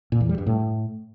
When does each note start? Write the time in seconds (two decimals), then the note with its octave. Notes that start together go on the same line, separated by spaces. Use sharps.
0.12 A#2
0.21 E2
0.29 G3
0.38 G2
0.47 A2